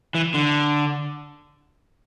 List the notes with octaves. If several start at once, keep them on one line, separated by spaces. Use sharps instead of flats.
E3
D3